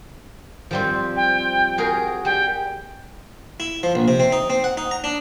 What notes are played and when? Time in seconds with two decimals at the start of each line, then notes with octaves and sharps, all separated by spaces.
0.71 F3 G3 C4
1.16 G5
1.78 F#4 G#4 A#4
2.25 G3 G5
3.60 E4
3.83 F3
3.95 A#1
4.08 C3
4.20 C4
4.32 D#4
4.50 C4
4.64 F#5
4.77 D#4
4.91 A#5
5.04 D4